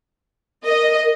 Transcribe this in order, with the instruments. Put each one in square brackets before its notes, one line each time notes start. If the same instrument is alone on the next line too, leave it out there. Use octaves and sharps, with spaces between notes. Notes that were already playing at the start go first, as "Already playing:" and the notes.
[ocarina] A#4 [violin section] D#5